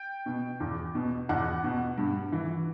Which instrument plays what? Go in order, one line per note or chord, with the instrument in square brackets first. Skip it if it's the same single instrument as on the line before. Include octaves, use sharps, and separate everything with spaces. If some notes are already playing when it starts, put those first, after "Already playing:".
Already playing: [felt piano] G5
B2
E2
B2
E2 F#5
B2
G2
E3